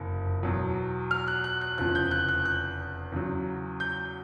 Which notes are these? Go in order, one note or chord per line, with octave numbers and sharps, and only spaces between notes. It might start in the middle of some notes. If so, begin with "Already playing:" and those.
Already playing: F#1 F2 C3
E2 B2 F#3
F6
F#6
F#6
F#6
F1 E2 C#3 F3 F#6
G6
F#6
F#6
F#6
E2 C#3 F#3
G6